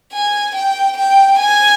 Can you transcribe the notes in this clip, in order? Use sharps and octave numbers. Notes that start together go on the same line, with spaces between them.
G#5
G5
G5
G#5